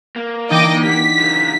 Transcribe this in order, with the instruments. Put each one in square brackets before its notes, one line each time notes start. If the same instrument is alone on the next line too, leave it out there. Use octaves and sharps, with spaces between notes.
[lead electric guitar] A#3
[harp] E3 D4 D#4 [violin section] D#5 G5 D6
[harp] G4 F#5 [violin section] B6
[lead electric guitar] F#2 C#3